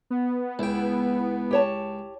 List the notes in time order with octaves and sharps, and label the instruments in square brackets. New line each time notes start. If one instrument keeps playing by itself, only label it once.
[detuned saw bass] B3
[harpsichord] C#2 G5 [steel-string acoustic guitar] E4
[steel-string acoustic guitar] G4 C#5 A5